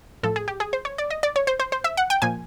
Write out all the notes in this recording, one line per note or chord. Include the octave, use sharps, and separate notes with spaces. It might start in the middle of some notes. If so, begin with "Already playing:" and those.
A2 F3 A4
G#4
G4
G#4
C5
C#5
D5
D#5
D5
C#5
C5
C5
C5
E5
F#5
G5
A#2 F3 G#5